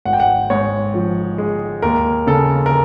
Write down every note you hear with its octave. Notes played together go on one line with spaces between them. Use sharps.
G#1 F#5
G5
F#5
G#2 C#5
F3
G#3
D#2 A#4
C#3 A4
A#4